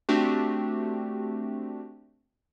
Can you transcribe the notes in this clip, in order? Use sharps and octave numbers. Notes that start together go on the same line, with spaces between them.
A3 C4 D4 F#4 G4